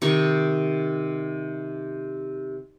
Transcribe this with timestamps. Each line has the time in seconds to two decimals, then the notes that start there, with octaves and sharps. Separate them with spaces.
0.02 C3 D#3 C#6